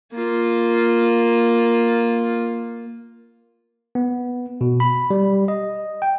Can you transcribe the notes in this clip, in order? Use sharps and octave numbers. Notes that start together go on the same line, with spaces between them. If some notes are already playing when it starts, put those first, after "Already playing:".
A#3 F4
B3
B2
B5
G3
D#5
G5